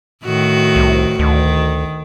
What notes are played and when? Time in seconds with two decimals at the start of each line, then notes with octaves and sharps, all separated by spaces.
0.24 A2 D#3 F#4
0.76 C2
1.19 D2 D#3